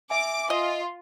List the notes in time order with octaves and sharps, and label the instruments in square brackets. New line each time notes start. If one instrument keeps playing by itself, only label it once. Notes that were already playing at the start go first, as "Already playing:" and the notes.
[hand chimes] E5 G#5 [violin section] D6
[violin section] F4 [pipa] D#5